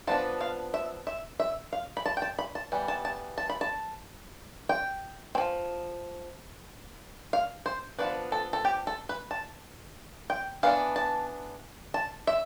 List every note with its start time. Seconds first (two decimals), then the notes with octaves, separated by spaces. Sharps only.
0.07 F3 B3 D4 A5
0.41 F5
0.74 E5
1.07 E5
1.40 E5
1.73 F5
1.97 B5
2.06 A5
2.17 G5
2.22 A5
2.39 B5
2.55 A5
2.72 E3 G3 B3
2.88 A5
3.05 A5
3.38 A5
3.50 B5
3.61 A5
4.69 G5
5.35 C4
5.38 F3
7.33 F5
7.66 C5
7.98 F3 B3 D4 B4
8.32 A4
8.53 A4
8.65 G4
8.87 A4
9.09 B4
9.31 A5
10.30 G5
10.63 E3 B3 D4 F5
10.96 A5
11.94 A5
12.27 E5